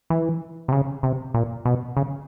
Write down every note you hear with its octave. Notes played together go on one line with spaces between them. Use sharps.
E3
C3
C#3
C3
A#2
B2
C#3